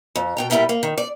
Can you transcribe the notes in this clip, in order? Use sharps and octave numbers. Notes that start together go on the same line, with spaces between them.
F2
B2 G5 A#5
A#2 G3 B3 E4 A#4 G5
A#3
D#3
D5